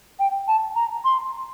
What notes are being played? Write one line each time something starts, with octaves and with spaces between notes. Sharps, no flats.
G5
A5
A#5
C6